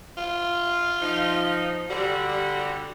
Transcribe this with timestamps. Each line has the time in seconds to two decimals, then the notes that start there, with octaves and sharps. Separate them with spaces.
0.17 F4
1.02 F3 D#4
1.90 D3 G3 F#4
2.28 G3